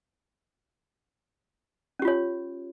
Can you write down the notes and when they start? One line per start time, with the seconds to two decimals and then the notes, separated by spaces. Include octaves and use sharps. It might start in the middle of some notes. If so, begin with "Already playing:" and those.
1.99 C#4
2.02 G4
2.05 F4
2.08 C#5